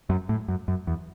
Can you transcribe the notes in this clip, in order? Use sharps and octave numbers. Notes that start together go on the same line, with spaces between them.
F#2
A2
F#2
F#2
E2